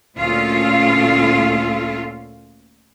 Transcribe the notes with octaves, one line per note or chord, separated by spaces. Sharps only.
D2 A#2 C#4 F4 A4 F5